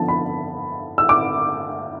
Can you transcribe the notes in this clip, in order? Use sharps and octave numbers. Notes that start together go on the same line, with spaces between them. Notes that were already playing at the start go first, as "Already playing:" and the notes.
Already playing: D3 F3 B3 A5
B5
E6
D6